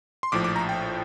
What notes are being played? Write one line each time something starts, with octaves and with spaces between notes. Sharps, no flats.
C6
A#1 A2 F3 D6
D6
A#5
G5